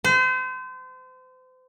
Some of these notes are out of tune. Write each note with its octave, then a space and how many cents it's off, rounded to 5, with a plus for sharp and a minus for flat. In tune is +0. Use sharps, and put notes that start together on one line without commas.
C5 -35